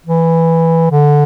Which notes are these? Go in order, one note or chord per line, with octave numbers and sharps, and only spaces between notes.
E3
D3